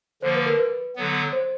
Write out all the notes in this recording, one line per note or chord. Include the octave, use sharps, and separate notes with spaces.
D3 F3 A#3 C5
B4
A#4
B4
D3 F#3 B3
C5